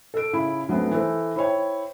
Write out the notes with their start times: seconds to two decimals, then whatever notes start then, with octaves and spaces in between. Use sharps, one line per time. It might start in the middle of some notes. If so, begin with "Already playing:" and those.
0.14 A4 D7
0.33 C#3 E4
0.68 D2 F#3 A3 B3 C4
0.91 E3 A4 C5
1.36 E4 C5 C#5 G5